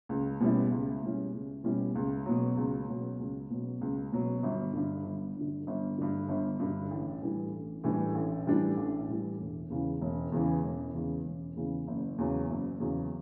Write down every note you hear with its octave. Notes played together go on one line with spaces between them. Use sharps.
C#2
B2 G3 C#4 E4
C#2
B2 G3 C#4 E4
C#2
B2 G3 C#4 E4
C#2
B2 F#3
C#2
B2 F#3
C#2
B2 F#3
C#2
B2 F#3
G1
G2 D3
G1
G2 D3
G1
G2 D3
G1
G2 D3
A1
A2 E3 G3 D4
A1
A2 E3 G3 D4
A1
A2 E3 G3 D4
A1
A2 E3 G3 D4
E1
E2 C#3 E3
E1
E2 C#3 E3
E1
E2 C#3 E3
E1
E2 C#3 E3
F#1
E2 C#3 F#3
F#1
E2 C#3 F#3